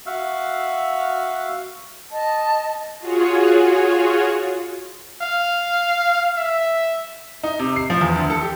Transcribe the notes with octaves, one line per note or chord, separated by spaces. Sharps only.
F#4 E5 F5
D#5 A5
F4 F#4 G#4 C#5
F5
E5
D#4
C3
C7
F3
E2
D2
A4
G4